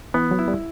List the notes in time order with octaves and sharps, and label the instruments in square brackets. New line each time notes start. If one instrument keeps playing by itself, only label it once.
[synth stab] E3 [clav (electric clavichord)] B3
[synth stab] F#3
[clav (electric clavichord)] E4
[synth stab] G3